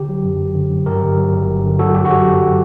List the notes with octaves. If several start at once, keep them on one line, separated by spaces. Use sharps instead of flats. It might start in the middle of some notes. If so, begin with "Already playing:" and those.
Already playing: D3 G4
F#3
F#2
F#2
D3
F#3
G2 G4 A#4
D3
F#3
G1
G2
D3
F#3 F#4 A4
F#2 G4
F#4
F#3 G4
F#2
F#3